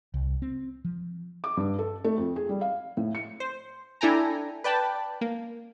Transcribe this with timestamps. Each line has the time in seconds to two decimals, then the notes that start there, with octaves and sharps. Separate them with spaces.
0.14 C2
0.42 C4
0.85 F3
1.44 D6
1.57 G2
1.79 A4
2.04 A3
2.18 F2
2.36 G#4
2.49 G3
2.61 F5
2.97 A2
3.15 C#7
3.40 C5
4.01 D4 E4 A4 G5 G#5 A#5
4.64 B4 D5 G5 A5 B5
5.21 A#3